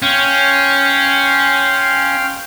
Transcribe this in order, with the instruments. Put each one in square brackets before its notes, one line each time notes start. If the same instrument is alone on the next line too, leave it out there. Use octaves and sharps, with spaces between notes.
[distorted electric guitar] C#4 [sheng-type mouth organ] F5 G5 C6